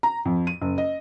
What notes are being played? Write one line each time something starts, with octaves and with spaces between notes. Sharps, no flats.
A#5
F2
D#7
F#1
D#5